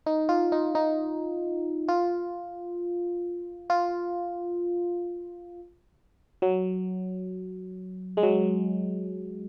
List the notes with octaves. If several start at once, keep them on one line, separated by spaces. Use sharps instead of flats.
D#4
F4
D#4
D#4
F4
F4
F#3
G#3
F#3